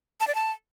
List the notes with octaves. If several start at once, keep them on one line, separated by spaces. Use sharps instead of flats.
A5
D5
A5